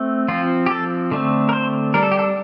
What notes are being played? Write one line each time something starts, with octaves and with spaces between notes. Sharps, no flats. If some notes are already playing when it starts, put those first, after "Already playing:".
Already playing: A3 C4
F3 C4 F4
G4
A4
D3 A3 C4
A#4
C5
G3 D4 A#4
A4
G4
A4